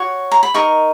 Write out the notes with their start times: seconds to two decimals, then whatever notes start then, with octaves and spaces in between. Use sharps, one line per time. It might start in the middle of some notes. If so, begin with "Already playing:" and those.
Already playing: F#4 C#5 C#6
0.32 A#5
0.43 B5
0.54 D#4 A#4 D#5 C#6